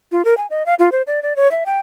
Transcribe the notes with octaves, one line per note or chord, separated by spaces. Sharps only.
F4
A#4
G#5
D#5
F5
F4
C5
D5
D5
C#5
E5
G5